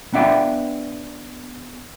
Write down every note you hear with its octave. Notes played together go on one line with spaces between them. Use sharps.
B3 D4 E5 G5